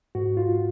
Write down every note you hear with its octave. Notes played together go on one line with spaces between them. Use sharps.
G#2 F#4
F4